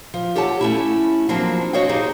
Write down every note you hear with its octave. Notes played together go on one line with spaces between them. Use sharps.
F3
G4 A4 C#5 F#5 A5
A3 C#4 E4
F3 F#3 A#3 C4 D4
F#4 C5 C#5 D#5 F5 G5
D4 D#4 G4 G#4 C5